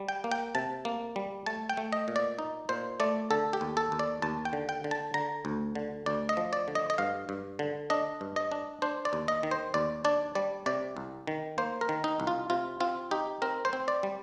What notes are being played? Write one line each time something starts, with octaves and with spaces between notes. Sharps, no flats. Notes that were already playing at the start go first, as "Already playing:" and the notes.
Already playing: G3
G5
A#3
G5
C3 A5
A#3
G3
A3 A5
G5
A3
D#5
A#2
D5
D#4
A#2 C5
A3 D5
D3 A4
G4
D#2
A4
D#2
D5
D#2 A5
G5
D3
G5
D3
A5
D3 A#5
D2
D3
D2 D5
D#5
F3
D5
D3
D#5
D#5
G2 F5
G2
D3
D4 D#5
G2
D#5
D4
D4 C5
D5
D#2
D#5
D#3
C5
D#2 D5
D4 D5
G3 D5
C3 D5
C2
D#3
A#3 C5
A#4
D#3
D#4
C2
F4
C3 F4
C4 F4
D#4 G4
C4 A#4
C5
C4
D5
G3